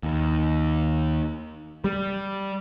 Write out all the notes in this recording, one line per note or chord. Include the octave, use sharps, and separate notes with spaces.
D#2
G3